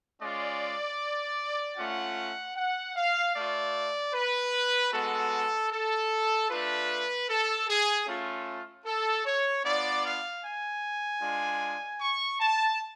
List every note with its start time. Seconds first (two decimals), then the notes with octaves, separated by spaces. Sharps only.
0.21 G#3 C#4 F4 D5
1.77 A3 C#4 F4 F#5
2.56 F#5
2.96 F5
3.35 A3 F4 D5
4.14 B4
4.92 G#3 B3 F#4 A4
5.71 A4
6.50 A3 D4 F4 B4
7.29 A4
7.69 G#4
8.07 A3 C#4 F4
8.86 A4
9.25 C#5
9.64 B3 D4 F4 D5
10.04 F5
10.43 G#5
11.21 G#3 D4 F4
12.00 C#6
12.40 A5